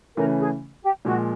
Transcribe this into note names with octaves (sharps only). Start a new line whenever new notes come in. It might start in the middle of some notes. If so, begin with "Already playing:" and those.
C#3 E3 A3 C#4 A#4
G#4
G4
A#2 F3 G#3 F#4